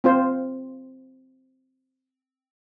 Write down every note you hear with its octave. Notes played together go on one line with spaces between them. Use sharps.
C4 F4 C5